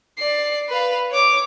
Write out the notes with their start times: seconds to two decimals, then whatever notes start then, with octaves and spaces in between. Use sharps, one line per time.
0.18 D5 C7
0.69 B4 F5
1.11 C#5 D6